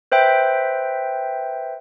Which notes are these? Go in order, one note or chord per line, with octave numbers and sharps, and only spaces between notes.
B4 C5 E5 G5